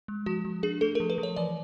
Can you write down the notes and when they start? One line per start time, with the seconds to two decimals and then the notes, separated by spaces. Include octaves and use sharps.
0.08 G#3
0.26 F3 F#4
0.45 F3
0.63 D4 G#4
0.81 A3 A4
0.95 A#4
1.00 F3
1.10 B4
1.18 F3
1.23 C#5
1.36 E3 D5